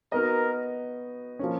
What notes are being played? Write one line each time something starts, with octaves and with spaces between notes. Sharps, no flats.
B3 D#4 F#4 A#4 B4 D#5
F3 A#3 C#4